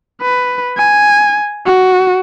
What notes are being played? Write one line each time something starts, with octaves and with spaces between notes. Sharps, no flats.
B4
G#5
F#4